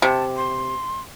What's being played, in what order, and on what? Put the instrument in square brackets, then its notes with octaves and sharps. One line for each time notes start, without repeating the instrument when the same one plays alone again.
[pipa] C3 [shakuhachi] A5
[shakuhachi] C6